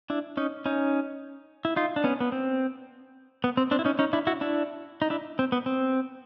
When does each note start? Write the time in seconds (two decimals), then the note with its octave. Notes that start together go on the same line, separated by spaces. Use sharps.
0.10 D4 E4
0.37 C#4 D#4
0.66 C#4 D#4
1.65 E4
1.76 D#4 F4
1.96 D4
2.04 B3 C#4
2.21 B3
2.32 C4
3.44 B3
3.57 C4
3.71 C4 D4
3.79 E4
3.85 C#4 D#4
3.99 C#4 D#4
4.13 D4 E4
4.27 E4 F#4
4.41 D4 E4
5.02 D#4
5.10 D4 E4
5.39 C4
5.52 B3
5.66 C4